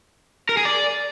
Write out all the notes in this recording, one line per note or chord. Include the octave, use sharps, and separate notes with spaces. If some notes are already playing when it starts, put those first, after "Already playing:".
A#4
G#4
D5